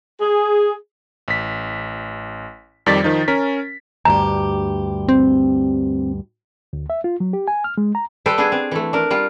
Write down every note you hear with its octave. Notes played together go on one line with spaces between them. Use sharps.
G#4
A1 B6
F2 D#3 G3 D5 A6 B6
D#3 F3 D#4
C#4 A#4 B6
D2 G2 G4 A#5
C4
D2
E5
F4
F#3
G4
G#5
F6
G#3
A#5
G3 A4 B4 C5 G5
B3 D4 G#4
C4
E3 A3
D4 A#4
G3 F4